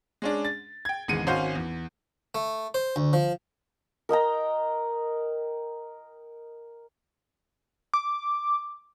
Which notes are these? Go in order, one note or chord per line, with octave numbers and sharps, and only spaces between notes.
G#3 C#4 D4
A6
G5 G#6
G#1 E2 C#3 G#3 C#7 D#7
G#1 C#4 F#4 C5 F5 G6
E2
A3
C5
D2
F3
A#4 D#5 G5 A#5
D6